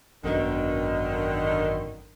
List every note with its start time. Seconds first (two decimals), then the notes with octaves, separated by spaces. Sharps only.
0.24 G#1 F#2 B2 D3 D#3